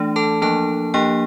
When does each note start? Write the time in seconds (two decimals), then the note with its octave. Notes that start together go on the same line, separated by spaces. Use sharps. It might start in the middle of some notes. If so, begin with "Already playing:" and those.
Already playing: E3 A3 D4
0.16 A4 A5
0.42 F3 A#3 D4 A4 A5
0.94 F3 A#3 D4 G4 G5